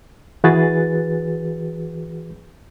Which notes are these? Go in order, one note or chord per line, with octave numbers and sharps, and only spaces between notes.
E3 F#4 G#4 B4 A6